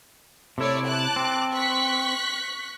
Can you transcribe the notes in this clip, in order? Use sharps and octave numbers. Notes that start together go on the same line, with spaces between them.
C3 A3 E4 C#5 D5
A5 D6 F#6
C4
C#6 F#6 B6